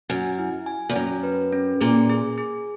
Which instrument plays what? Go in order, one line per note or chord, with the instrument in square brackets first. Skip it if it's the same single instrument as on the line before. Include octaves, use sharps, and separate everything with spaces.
[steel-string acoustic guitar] F#2 [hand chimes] G#5
[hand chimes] E4
G#5
[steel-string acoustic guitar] E2
[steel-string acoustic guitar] F#2 [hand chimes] C#4
[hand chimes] B4
C#4
[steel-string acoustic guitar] A#2 [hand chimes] G#4
[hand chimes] G#4
G#4